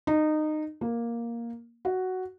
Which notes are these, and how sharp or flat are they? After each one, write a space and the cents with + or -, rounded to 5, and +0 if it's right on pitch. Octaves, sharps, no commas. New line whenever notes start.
D#4 -20
A#3 +5
F#4 +5